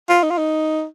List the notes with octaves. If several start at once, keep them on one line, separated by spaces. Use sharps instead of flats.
F4
D#4
F4
D#4